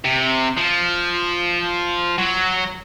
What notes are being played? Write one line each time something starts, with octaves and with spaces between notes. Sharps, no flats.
C3
F3
F#3